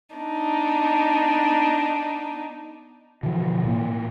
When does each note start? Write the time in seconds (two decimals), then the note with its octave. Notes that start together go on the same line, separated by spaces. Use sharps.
0.15 B3 D4 D#4
3.23 B2 D3 E3 F3
3.65 A2 A#3